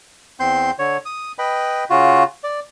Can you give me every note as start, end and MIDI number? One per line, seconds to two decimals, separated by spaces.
0.40 0.71 40
0.40 0.71 60
0.40 0.71 84
0.40 0.71 91
0.79 0.97 50
0.79 0.97 73
1.05 1.32 87
1.39 1.84 71
1.39 1.84 75
1.39 1.84 79
1.39 1.84 83
1.90 2.24 49
1.90 2.24 65
1.90 2.24 66
2.44 2.60 74